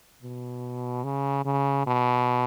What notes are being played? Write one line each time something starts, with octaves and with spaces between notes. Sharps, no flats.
B2
C#3
C#3
B2